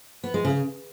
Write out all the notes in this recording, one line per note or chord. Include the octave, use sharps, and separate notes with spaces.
B3
G#3
C#3